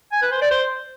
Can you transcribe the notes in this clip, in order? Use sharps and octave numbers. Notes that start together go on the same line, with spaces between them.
G#5
B4
C5
D5
C5